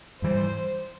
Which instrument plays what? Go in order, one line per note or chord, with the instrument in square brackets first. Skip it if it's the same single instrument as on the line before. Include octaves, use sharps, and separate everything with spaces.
[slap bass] G#2 E3 G3 [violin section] C5